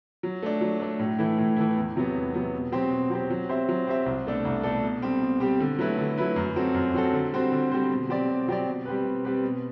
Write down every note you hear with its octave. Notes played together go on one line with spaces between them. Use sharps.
F#3
A3 D4
F#3
A3 D4
A2
E3 A3 E4
A2
E3 A3 E4
E2
C3 F#3 B3
E2
C3 F#3 B3
B2
F#3 C4 G4 C5
B2
F#3 C4 G4 C5
F#3
C4 G4 C5 E5
F#3
C4 G4 C5 E5
C2
B2 A3 D4 A4
C2
B2 A3 D4 A4
B2
G3 C4 G4
B2
G3 C4 G4
D3
F#3 A3 E4 B4
D3
F#3 A3 E4 B4
F#2
F#3 C4 F#4 A4
F#2
F#3 C4 F#4 A4
D3
G3 C4 F#4 C5
D3
G3 C4 F#4 C5
B2
F#3 C4 G4 D5
B2
F#3 C4 G4 D5
B2
G3 C4 G4 B4
B2
G3 C4 G4 B4
B2